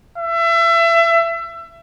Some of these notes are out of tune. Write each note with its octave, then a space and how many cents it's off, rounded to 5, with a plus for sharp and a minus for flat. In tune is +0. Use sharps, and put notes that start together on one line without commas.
E5 +30